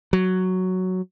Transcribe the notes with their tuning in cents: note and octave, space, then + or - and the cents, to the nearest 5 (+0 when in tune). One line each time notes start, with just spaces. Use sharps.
F#3 +0